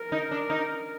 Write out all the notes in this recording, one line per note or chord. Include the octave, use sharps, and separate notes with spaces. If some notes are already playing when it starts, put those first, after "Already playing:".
Already playing: A#4
D#4
D4
D#4